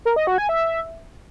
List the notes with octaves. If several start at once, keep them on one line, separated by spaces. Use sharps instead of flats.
A#4
D#5
F#4
G#5
E5